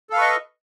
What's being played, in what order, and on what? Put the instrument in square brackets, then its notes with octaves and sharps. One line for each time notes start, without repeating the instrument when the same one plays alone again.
[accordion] A4
F5
B4
C#6
D#5